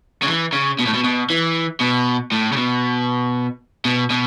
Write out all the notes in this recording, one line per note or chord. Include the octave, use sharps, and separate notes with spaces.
C#3
E3
C#3
B2
A2
B2
B2
E3
B2
A2
C#3
B2
B2
B2